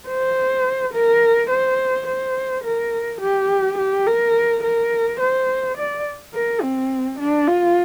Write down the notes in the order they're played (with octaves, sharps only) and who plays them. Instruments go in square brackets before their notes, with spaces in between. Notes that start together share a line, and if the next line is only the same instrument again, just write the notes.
[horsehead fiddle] C5
A#4
C5
C5
A#4
G4
G4
A#4
A#4
C5
D5
A#4
C4
D4
F4